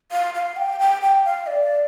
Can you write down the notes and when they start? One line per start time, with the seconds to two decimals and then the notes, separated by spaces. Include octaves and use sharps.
0.12 F5
0.34 F5
0.57 G5
0.80 G5
1.02 G5
1.25 F5
1.47 D5